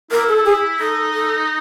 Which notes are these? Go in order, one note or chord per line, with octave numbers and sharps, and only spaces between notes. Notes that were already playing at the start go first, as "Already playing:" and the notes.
E4 A#4
A4
G#4
D#4 A4
A4